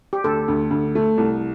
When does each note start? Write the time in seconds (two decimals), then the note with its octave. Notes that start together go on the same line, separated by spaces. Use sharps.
0.13 G4
0.24 D2 A4
0.48 D2
0.71 D2
0.95 A3
1.18 C2